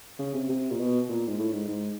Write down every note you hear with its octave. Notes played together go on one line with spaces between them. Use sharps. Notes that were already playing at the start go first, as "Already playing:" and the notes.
C#3
C3
C3
A#2
B2
A#2
G#2
A2
G#2
G#2